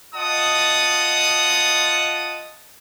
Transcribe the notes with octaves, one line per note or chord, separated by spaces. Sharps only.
F4 D#5 F#5 A5 D#6